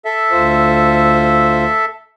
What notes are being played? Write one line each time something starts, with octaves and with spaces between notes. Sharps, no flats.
A4 E5
D2 F4 C5